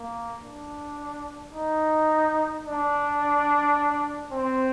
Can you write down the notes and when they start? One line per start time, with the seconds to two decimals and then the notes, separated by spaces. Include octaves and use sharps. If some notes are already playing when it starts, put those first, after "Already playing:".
Already playing: A#3
0.42 D4
1.52 D#4
2.65 D4
4.32 C4